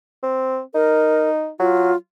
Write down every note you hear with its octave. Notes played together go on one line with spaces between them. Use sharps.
C4
D#4 A#4
F#3 F4